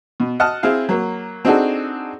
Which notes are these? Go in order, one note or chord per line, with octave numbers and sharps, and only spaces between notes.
B2
D#5 F#5 A5 F6
C4 E4 G#4 F5
F#3 A#3
C4 D4 D#4 F#4 G#4 A4